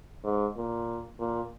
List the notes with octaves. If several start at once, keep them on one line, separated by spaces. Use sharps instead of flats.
G#2
A#2
A#2